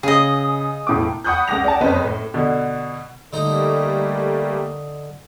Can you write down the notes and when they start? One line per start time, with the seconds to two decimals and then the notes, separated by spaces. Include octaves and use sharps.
0.03 C#3 G#4 D#5
0.87 E1 A2 D6
1.24 F#5 B5 C#6 D#6 F#6 G6
1.48 C#2 F#5 D6 A#6 F7
1.64 D5 F#5 A5
1.81 F#1 F2 C#4 B4 C5 D#5
2.04 A2
2.34 B2 D3
3.33 D3 G3 A3 A#3 D#4